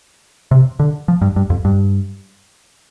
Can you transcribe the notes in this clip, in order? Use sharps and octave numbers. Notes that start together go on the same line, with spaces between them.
C3
D3
F3
G2
G2
F2
G2